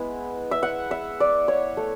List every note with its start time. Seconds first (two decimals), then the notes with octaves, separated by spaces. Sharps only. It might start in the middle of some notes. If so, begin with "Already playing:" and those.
Already playing: G#3 B3 E4
0.51 E5
0.63 F#5
0.91 E5
1.20 D5
1.48 C#5
1.77 A3